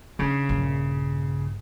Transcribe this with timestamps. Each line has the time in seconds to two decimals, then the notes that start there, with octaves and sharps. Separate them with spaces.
0.19 C#3 D4 D#4
0.49 A#1 G2